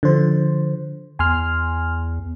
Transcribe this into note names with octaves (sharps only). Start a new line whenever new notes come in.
D3 F3 C5
E2 G#5 C6 F6